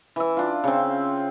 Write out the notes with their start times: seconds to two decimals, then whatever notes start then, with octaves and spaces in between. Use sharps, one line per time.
0.16 E3 E5
0.37 D4 F4
0.64 C#3 C4